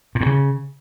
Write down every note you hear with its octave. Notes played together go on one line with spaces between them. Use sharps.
A#2
A2
C#3